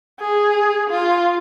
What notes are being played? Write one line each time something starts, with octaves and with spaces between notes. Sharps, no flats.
G#4
F4